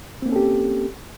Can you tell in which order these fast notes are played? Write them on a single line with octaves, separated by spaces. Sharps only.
C4 A#3 C#4 A4 G4